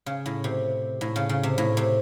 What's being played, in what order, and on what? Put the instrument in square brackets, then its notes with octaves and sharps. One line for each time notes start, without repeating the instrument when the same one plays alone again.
[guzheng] C#3
A2
C3
A2
C#3
C#3
C3
A2
C3